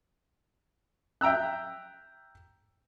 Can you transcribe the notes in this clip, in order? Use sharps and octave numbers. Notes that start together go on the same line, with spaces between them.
E5 G5 A#5 E6 F#6